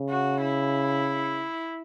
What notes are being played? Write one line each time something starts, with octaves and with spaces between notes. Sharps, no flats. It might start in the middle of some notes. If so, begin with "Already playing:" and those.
Already playing: C#3
F#4
E4